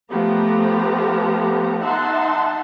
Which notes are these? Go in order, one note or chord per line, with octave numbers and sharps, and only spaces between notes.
F3 A3 B3 G4 A#5
D#4 E5 F#5 A5 C6